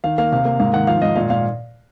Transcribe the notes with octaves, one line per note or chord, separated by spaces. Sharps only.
D#3 F5
A#3 F5
C3 F5
A#3
G#2 F5
D#3 F#5
F3 F5
G#2 D#5
A#2 F5
A#2 F5